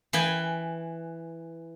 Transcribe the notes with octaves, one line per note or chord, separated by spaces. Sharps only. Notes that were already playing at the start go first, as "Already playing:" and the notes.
E3 B4 G5 G#5